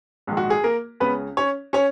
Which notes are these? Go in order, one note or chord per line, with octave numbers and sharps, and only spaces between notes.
A#1 G#2 D#3
F#4
G#4
A#3 A#4
C#2 C#3 B3 B4
C#4 C#5
C#4 C#5